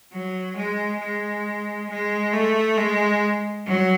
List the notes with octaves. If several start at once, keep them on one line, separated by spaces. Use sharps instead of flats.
F#3
G#3
G#3
G#3
A3
G#3
F#3